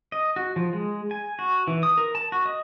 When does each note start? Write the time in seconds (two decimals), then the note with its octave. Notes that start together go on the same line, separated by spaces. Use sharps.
0.12 D#5
0.36 F#4
0.56 F3
0.73 G#3
1.11 G#5
1.39 F#4
1.68 E3
1.83 D#6
1.98 A#4
2.15 A5
2.32 F#4
2.46 D#5